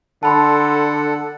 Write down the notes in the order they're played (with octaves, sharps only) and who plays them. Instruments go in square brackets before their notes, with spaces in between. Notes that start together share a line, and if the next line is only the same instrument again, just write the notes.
[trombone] D3 [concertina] A4 F#5 [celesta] A5 B5 C6